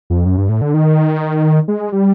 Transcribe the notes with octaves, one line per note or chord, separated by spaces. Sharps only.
F2
F#2
G2
A2
D3
D#3
G#3
G3